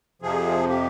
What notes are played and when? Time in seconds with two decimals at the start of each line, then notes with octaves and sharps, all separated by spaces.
0.22 F2 C3 F3 G#4
0.69 G4